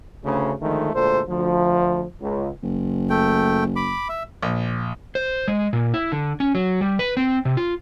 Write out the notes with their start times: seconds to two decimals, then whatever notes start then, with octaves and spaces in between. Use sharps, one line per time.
0.25 D2 C#3
0.61 D3 D#3 F3 G#3 A3
0.94 D2 A#2 G#3 A4 C5
1.28 D2 F3
2.22 C#2
2.63 F#1
3.10 A3 G5
3.76 B5 D6
4.09 E5
4.43 A#1
5.15 C5
5.48 G#3
5.73 A#2
5.94 E4
6.12 D3
6.40 C#4
6.55 F#3
6.81 G3
6.99 B4
7.17 C4
7.45 C3
7.57 F4